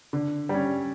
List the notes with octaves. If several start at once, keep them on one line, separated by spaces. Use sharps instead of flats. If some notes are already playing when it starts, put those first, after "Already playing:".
D3
G3
C#4